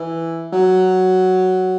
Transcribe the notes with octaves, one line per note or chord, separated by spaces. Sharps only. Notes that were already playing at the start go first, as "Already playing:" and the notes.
Already playing: E3
F#3